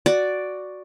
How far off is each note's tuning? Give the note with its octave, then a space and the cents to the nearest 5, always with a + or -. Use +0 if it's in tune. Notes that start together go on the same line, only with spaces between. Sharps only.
F#4 +0 D5 +0